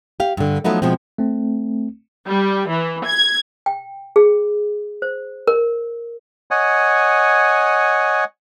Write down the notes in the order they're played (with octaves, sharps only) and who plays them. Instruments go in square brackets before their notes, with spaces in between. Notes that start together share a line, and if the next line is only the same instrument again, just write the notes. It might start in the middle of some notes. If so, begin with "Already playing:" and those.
[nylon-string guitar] G4 F5
G2 D3
F3 F#3 A3 B3 D#4
B2 F3 G#3 C4
[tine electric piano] A3 C4
[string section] G3
E3
G#6
[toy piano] G5
G#4
C5
A#4
[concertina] C#5 D#5 F#5 G#5